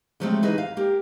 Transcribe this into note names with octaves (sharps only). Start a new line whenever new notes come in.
D3 F3 F#3 G#3 A3 C4
E3 D#4 G#4 B4
F5
A#3 G4